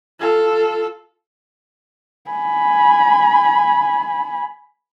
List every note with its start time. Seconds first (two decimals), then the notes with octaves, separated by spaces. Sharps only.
0.20 F4 A4
2.31 G#5 B5